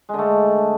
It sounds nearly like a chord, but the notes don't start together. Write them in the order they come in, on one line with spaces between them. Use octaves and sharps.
G#3 D3 A3